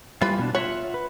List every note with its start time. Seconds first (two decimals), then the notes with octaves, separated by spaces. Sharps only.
0.22 E3 G3 F4 B4
0.39 B2 D4
0.55 F4 C#5 E5 F#5
0.94 B4